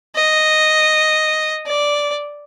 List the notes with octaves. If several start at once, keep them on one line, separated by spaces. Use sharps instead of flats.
D#5
D5